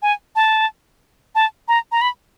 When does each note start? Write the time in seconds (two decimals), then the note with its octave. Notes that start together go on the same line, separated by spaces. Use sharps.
0.02 G#5
0.36 A5
1.35 A5
1.68 A#5
1.92 A#5
2.01 B5